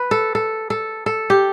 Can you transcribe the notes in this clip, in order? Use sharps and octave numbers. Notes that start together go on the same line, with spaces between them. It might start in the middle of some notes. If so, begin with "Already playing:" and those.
Already playing: B4
A4
A4
A4
A4
G4